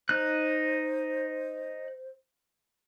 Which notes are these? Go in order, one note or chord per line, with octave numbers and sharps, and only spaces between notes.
D#4 C5 F#6